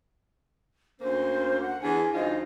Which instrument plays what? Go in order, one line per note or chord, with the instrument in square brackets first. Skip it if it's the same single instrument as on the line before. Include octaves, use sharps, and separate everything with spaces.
[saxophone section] D2 A#3 C#4 [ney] C5
[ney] F#5
[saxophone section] E2 D4 [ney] G#5
[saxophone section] D2 F3 F4 [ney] D#4